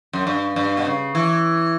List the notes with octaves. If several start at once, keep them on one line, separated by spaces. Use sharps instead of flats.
F#2
G2
G2
B2
C#3
E3